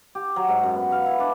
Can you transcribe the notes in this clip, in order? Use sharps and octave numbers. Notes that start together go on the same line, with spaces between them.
G4
F#3
G#2
F#2
B3
F5
E4
D4